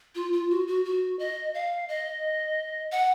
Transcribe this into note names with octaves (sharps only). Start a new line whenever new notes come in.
F4
F4
F#4
F#4
F#4
D#5
F5
D#5
F#5